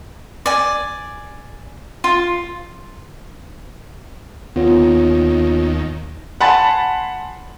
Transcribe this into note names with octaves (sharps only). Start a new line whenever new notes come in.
D5 G#5
F4
D#2 B3 F4 C#5
F#5 G#5 A5 B5 C6 A6